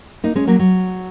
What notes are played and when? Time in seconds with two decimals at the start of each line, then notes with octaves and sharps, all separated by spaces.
0.24 A#3 D#4
0.35 G#3 C#4
0.47 F#3 A#3
0.59 F#3